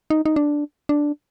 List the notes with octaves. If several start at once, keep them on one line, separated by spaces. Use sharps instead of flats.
D#4
D#4
D4
D4